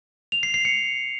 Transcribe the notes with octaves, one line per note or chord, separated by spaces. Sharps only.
F7
C7
C7
C#7